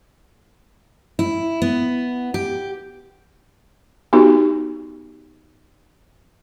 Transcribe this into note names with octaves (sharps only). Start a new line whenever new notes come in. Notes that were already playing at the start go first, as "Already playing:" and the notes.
E4
B3
G4
B3 D#4 F#4 G4